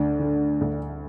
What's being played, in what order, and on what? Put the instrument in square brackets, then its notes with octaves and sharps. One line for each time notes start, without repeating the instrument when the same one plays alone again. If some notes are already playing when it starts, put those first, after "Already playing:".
Already playing: [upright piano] D2 [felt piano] D4
[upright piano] D3
D2